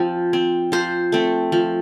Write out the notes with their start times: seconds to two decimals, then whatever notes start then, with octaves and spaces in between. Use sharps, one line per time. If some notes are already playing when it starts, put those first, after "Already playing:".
Already playing: F3 C4
0.33 C4
0.72 F3 C5
1.12 A3 C4
1.52 F3